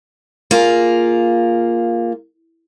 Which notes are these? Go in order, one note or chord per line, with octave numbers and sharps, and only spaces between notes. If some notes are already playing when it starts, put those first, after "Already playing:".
A#3 F4 G#4